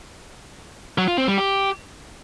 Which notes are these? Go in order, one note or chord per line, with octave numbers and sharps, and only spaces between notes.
F#3
F4
C4
G3
G4